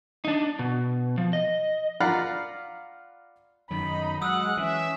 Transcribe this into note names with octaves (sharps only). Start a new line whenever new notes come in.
D4 D#4
B2
F3
D#5
F4 D5 F5 F#5 A#5 B5
F#2 D#3 F#3 D#4 B5
F#3 G#3 F#5 D#6 E6 F#6
E3 C#4 E5